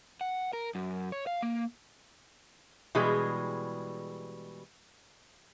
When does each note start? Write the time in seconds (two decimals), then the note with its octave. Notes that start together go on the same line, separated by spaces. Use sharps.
0.21 F#5
0.53 A#4
0.75 F#2
1.12 C#5
1.27 F5
1.42 A#3
2.95 B2 E3 G3 G#3 G#4